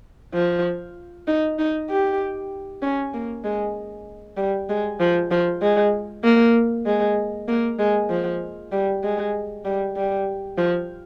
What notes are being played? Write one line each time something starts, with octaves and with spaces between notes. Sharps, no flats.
F3
D#4
D#4
G4
C#4
A#3
G#3
G3
G#3
F3
F3
G#3
A#3
G#3
A#3
G#3
F3
G3
G#3
G3
G3
F3